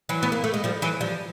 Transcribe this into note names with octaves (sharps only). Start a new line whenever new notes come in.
E3 F#3
B3
A#3
A3
G#3
F3 G3
E3 F#3
F3 G3